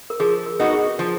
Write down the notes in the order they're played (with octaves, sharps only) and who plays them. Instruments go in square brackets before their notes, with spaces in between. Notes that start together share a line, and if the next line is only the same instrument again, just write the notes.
[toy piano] A#4
[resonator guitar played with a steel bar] F3 [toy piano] G#4
[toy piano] A#4
[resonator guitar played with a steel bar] B3 D#4 F#4
[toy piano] G#4
[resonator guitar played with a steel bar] F3